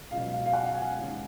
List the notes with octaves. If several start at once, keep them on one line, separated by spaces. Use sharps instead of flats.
C#2 B2 F#3 F5
F5
F5
F#5
G#5
D#2 C#3 G#3